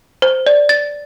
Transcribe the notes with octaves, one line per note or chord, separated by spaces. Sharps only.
C5
D5
A6